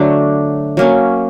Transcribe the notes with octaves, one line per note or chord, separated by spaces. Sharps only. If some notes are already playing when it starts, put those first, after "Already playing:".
Already playing: D3 F#3 A3 D4
F#3 A#3 C#4